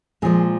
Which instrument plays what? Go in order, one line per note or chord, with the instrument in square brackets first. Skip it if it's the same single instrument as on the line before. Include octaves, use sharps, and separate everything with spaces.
[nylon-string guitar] A#2 F3 G#3 G#4